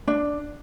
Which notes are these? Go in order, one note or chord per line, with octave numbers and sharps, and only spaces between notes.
D4